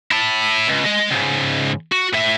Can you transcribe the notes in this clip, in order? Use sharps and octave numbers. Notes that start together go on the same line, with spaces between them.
E4 A5
C#2
G#3 D#5
C#2 G#2
F#4
A2 E5